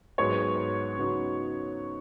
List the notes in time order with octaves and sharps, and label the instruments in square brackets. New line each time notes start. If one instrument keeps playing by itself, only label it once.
[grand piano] G#2 F#3 B3 G#4 B4 [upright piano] C#5
[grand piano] C#3 F#3 B3 D#4 F#4